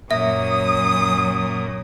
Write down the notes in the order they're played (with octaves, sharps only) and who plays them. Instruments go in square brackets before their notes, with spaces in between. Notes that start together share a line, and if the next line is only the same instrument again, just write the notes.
[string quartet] F#2 [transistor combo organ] A#2 [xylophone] E5 [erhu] D#6